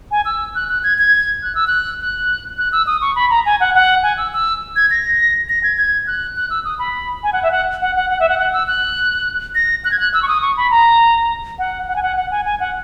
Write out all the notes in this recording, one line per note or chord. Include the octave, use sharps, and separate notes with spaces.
G#5
E6
F#6
F#6
G#6
G#6
F#6
E6
F#6
F#6
F#6
E6
D#6
C#6
B5
A#5
G#5
F#5
F#5
G#5
E6
E6
G#6
A#6
A#6
G#6
G#6
F#6
F#6
E6
D#6
B5
G#5
F#5
E5
F#5
F#5
F#5
F#5
E5
F#5
F#5
E6
F#6
A#6
F#6
G#6
F#6
E6
C#6
D#6
C#6
B5
A#5
F#5
F#5
G#5
F#5
F#5
G#5
G#5
F#5